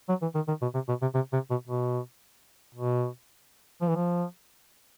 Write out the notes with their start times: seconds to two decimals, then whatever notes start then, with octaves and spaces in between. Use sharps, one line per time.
0.09 F#3
0.22 E3
0.35 D#3
0.48 D#3
0.62 B2
0.74 C3
0.88 B2
1.02 C3
1.15 C3
1.33 C3
1.50 B2
1.67 B2
2.75 B2
3.82 F3
3.89 E3
3.96 F3